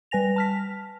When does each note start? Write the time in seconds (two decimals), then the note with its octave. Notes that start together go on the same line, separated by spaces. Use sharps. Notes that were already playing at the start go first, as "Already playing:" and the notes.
0.11 G3 B4 G#5 A#6 F7
0.36 A5 F6 B6